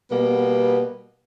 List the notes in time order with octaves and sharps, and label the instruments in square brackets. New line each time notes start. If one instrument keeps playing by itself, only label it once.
[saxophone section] B2 G3 A#3 B3